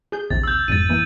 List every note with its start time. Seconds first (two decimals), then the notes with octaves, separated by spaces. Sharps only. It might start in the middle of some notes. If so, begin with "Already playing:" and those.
0.12 G#4 G6
0.30 A#1 D#2 C3 A6
0.43 E6 G6
0.68 G1 F2 G#2 A6 D#7
0.89 E3 A#3